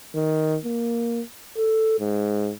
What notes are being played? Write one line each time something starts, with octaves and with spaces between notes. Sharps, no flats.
D#3
A#3
A4
G#2